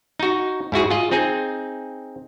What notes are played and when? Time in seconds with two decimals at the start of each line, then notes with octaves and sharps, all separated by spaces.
0.20 D#4 F#4
0.72 G#2 E4 F#4 G#4
0.91 F4 G#4 D#5
1.11 C4 D#4 G#4 G#5